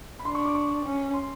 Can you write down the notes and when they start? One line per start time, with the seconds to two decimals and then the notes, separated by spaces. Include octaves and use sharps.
0.19 B5
0.25 D4 C6
0.35 C#6
0.45 D6
0.55 C#6
0.85 C#4
1.14 C6